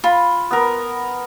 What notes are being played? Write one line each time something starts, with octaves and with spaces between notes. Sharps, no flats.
F4 B5
B3 A#4